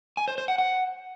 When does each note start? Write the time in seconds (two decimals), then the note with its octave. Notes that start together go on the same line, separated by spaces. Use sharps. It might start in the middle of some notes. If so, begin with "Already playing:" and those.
0.17 G#5
0.28 C5
0.38 C5
0.48 F#5
0.58 F#5